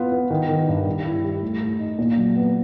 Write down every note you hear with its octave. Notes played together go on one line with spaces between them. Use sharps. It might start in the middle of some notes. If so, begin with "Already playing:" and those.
Already playing: B3 F4
B3
D#3
D#3
G2
G3
E4
G3
A3
A3
D#4
A#2
F#3
B3